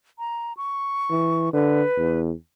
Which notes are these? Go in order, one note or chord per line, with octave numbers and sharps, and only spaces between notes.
A#5
C#6
E3
D3 B4
E2